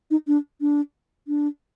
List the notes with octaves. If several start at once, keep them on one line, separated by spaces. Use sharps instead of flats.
D#4
D4
D4
D4